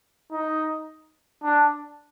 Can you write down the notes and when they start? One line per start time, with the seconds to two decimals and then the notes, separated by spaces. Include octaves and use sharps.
0.32 D#4
1.43 D4